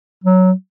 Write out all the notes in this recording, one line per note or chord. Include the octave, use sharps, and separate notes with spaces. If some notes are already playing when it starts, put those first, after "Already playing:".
F#3